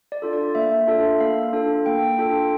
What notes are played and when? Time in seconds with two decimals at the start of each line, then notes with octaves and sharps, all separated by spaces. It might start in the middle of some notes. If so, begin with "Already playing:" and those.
0.12 D5
0.22 D4 F4 A4
0.33 D5
0.55 A#3 E5
0.87 D4 F4 A4
1.20 A#3 F5
1.53 D4 F4 A4
1.86 A#3 G5
2.19 D4 F4 A4